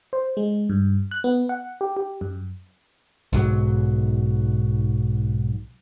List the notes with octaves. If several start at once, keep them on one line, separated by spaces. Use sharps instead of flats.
C5
G#3
G2
F#6
B3
F#5
G4
G4
F#2
B1 G#2 F#3